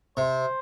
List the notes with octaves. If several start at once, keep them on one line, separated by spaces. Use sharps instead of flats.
C3 C5